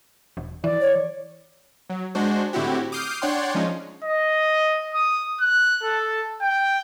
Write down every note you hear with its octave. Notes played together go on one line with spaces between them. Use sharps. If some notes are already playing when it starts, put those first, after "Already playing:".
E1
E3 D5
C#5
F#3
G#3 D4 F#4 C5
A2 D3 C4 E4 F#4 G4
D6 D#6 F6 G6 C7
D4 C#5 D5 F#5 G5 C6
F3 G#3 C#4 D#4 F4
D#5
D#6
F#6
A4
G5